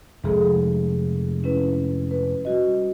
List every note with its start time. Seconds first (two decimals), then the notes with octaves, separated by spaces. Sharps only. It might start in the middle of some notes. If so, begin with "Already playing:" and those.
0.24 F1 G#3 G#4 A4
1.44 C#4 E4 B4
2.11 B4
2.45 G3 F#4 D#5